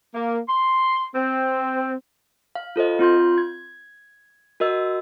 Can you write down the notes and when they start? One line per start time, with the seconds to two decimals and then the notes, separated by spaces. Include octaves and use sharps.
0.13 A#3
0.48 C6
1.14 C4
2.55 F5
2.76 F4 A4 C5 D#5
2.99 C4 F4 C6 G6
3.38 G#6
4.60 F#4 A#4 D#5 E6